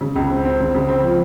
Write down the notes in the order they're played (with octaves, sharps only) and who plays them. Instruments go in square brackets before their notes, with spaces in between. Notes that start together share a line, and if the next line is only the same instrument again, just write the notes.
[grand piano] C#3
C#2
C4
C4
C#3
C#3
C4
F3